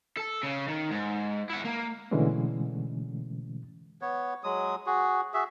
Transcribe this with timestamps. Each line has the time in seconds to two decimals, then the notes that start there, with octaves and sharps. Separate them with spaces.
0.17 A4
0.43 C#3
0.68 D#3
0.91 G#2
1.50 E4 F#5
1.65 A#3
2.11 B2 D3 E3 G#3 A3 C#4
4.01 B3 C#5
4.44 F#3 G#3 D#6
4.86 F#4 G#4
5.34 F#4 G#4 E5